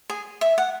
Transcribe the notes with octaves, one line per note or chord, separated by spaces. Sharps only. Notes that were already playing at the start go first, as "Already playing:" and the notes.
G#4
E5
F#5